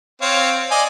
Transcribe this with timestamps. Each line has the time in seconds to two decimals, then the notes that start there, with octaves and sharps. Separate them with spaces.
0.22 C4 C#5 F5
0.71 D5 D#5 G#5